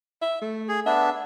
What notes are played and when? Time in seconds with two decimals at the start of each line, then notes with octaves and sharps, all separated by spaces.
0.22 E5
0.41 A3
0.69 G#4
0.86 B3 D4 E5